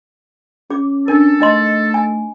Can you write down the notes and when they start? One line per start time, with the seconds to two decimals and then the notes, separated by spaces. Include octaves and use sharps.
0.70 C#4 G#4 D6
1.08 D4 A4 A#4
1.41 A3 D#4 D#5 C6
1.94 G#5